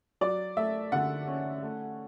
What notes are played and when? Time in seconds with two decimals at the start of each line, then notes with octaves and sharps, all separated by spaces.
0.21 F#3 D5
0.57 A3 E5
0.92 D3 F#5
1.27 C#4
1.63 A3